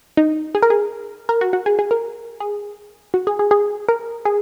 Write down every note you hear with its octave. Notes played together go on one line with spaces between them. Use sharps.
D#4
G#4
A#4
G#4
A#4
F#4
F#4
G#4
G#4
A#4
G#4
F#4
G#4
G#4
G#4
A#4
G#4